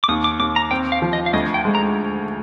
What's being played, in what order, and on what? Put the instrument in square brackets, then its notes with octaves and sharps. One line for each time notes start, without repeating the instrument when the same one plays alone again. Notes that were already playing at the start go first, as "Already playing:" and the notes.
[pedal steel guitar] D6
[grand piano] D#2 [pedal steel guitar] D#6
[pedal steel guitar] D6
[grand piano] D#2 [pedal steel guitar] D6
[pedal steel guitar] A#5
[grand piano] C4 [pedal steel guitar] G5
[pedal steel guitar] F5
[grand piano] F3
[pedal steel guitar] D#5
F5
[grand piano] D2 [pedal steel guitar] D#5
[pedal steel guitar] G5
[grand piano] G#3
[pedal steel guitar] A#5